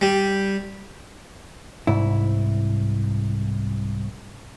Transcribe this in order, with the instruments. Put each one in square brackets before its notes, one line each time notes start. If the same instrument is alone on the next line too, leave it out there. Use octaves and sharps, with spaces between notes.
[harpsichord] G3
[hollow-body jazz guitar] C2 G#2 E4